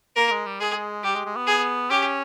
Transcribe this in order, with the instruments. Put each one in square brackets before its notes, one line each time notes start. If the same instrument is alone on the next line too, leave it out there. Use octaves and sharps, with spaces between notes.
[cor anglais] A#3 [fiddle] A#4
[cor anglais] G#3
G3
[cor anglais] G#3 [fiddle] G#4
[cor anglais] G3 [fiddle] G4
[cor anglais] G#3
G#3
B3
[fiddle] G#4
[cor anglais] C#4 [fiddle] G4